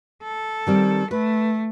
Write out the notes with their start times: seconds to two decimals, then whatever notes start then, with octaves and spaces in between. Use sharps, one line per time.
0.23 A4
0.67 D#3 G3 C4
1.11 A3 B4